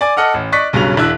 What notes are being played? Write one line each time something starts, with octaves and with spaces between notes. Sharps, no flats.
D5 G#5 D6
A4 D#5 F#5 F6
A1
D5 D#5 C#6 F#6 B6
B1 G2 C#3 F#3 F7
E1 D4 E4 E5 F#6